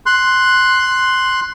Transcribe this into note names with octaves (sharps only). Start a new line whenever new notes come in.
C6 F#6